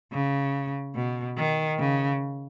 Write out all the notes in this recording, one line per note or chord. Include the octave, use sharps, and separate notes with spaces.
C#3
B2
D#3
C#3